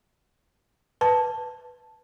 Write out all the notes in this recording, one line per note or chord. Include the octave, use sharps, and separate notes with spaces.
B4 A5